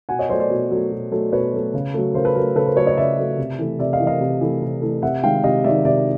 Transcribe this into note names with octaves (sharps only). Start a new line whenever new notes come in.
B2 F#5 G#5
C#5 D#5
F#3 A3 C5 D5
C5 D5
B2
F#3 A3
B2
F#3 A3
B2 B4 C#5
F#3 A3
C#3
F#3 A3
C#3 A#4 C5
A4 B4
F#3 A3 A#4
C#3 A4 B4
A#4 C5
F#3 A3 B4 C#5
C#5 D#5
C#3 D5 E5
F#3 A3
C3
E3 A3
C3 D5 E5
D#5 F5
E3 A3
D#5 F5
C3
E3 A3
C3
E3 A3
C3 E5 F#5
D#3 G#3 F5 G5
C3 D#5 F5
D#3 G#3 D5 E5
C3 D5 E5